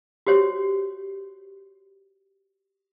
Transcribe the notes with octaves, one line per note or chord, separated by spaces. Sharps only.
F#4 G4 C5 C#5